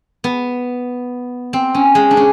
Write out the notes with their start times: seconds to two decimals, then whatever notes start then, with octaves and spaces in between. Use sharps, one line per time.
0.24 B3
1.53 C4
1.74 C#4
1.95 G#3
2.11 D4
2.17 C#4